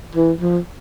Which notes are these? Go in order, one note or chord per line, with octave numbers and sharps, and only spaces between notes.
E3
F3